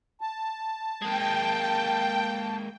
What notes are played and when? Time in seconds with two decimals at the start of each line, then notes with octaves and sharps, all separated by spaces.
0.21 A5
1.02 G#3 A#3 G5